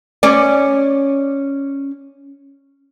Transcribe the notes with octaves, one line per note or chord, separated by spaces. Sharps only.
C#4 D5